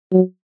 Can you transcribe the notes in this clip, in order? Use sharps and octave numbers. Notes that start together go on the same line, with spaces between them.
F#3